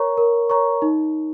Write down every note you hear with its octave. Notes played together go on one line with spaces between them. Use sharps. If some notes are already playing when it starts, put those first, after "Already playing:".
Already playing: A#4 C#5 A#5 C#6
A#4
C#5 A#5 C#6
D#4